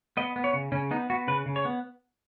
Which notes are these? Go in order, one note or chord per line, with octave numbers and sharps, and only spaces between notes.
B3 D#5
B3
C#5
C#3
C#3 C#4
B3 D#4
B3 F#4
C#3 B4
C#3
C#5
B3